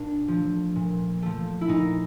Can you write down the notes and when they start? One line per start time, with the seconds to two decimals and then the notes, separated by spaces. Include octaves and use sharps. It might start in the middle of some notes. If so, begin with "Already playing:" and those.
Already playing: A#2 D4
0.28 F3 A3
0.76 A#2
1.22 F3 A3
1.61 E4
1.68 A#2 D#4